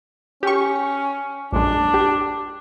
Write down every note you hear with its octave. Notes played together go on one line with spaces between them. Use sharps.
C#4 G4 C#6
A#1 F#2 G#3 D4
G4